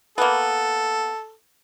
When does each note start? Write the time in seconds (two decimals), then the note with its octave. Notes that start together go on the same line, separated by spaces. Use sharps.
0.18 A#3 B3 A4